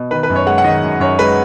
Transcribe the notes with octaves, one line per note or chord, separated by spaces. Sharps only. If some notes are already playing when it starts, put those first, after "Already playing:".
Already playing: B2
D#3 B4
B4
F#2
C#5
G#3 F#5
F#5
D#3 D#5
F#2
F#2 C#5
G#3 B4